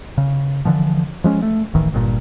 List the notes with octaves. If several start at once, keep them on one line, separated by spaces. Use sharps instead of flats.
C#3
D3 E3 F3
F3 G#3 C#4
A3
D1 A1 D#3 E3
G1 G2 A#2